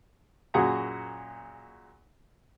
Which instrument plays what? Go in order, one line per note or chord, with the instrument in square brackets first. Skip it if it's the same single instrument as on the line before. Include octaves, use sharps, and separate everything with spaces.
[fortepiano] F#2 A#2 F#4 G#4 F#5 A#5